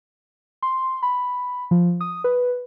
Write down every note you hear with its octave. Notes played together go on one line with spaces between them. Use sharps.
C6
B5
F3
D#6
B4